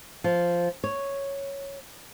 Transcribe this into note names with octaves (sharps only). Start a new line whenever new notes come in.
F3
C#5